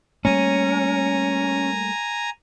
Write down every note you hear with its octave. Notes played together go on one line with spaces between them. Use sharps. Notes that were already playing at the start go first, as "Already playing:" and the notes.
G3 A3 A#3 C#4 G#5 A#5